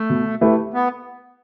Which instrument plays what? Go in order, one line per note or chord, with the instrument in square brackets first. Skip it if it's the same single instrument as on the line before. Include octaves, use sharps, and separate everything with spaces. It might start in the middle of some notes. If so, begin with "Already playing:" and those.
Already playing: [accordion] A3
[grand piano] B2
A3 E4 G4 B4
[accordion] B3